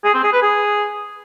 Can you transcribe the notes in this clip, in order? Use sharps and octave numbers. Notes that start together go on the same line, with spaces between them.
G#4
C4
G#4
B4
G#4